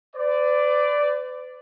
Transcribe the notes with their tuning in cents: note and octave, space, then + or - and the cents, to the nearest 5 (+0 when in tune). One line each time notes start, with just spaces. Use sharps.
B4 +45 D5 +0